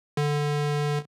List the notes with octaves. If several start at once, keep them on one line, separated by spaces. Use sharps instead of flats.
D3